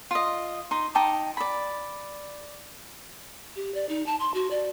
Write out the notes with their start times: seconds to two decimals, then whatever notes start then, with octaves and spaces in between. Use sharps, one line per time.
0.11 F4 D#5
0.71 D#4 C6
0.95 D#4 G5 A5 D6
1.37 D5 B5
3.56 G4
3.75 D5
3.89 D#4
4.06 A5
4.20 C6
4.34 F#4
4.51 D5